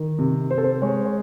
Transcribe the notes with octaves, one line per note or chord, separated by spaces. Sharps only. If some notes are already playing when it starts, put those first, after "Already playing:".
Already playing: D#3
C3
C3 C5
A4
C5
G#3 C#5
C#5